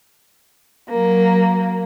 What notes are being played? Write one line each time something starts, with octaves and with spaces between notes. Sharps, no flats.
F#3 A#3